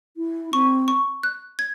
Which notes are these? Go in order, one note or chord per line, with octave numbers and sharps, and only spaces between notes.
E4
C4 C#6
C#6
F#6
G#6